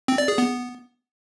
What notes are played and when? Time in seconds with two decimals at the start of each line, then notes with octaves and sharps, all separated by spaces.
0.08 C4
0.18 D5
0.28 G#4
0.38 B3